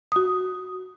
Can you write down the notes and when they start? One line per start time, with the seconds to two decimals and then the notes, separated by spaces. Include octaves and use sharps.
0.12 F#4 D#6